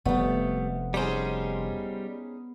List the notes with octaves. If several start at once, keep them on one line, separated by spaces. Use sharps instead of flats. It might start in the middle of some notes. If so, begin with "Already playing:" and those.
F1 G3 A3 B3
G3 C#4 D#4 G#4 C5